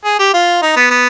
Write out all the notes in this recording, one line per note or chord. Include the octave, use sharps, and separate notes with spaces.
G#4
G4
F4
D#4
B3
B3